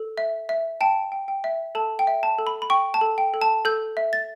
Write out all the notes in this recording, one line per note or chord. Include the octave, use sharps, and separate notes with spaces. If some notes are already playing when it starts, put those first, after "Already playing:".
Already playing: A4
E5
E5
G5 A5
G5
G5
E5
A4 A5
G5
E5
A5
A4
B5
B5
G5 C#6
A5
A4
G5
A4
A5
A4 G6
E5
A6